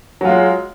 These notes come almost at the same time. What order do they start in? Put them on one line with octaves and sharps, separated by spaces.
F#3 F4 G#3